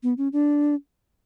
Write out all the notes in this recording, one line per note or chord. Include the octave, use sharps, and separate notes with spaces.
B3
C#4
D4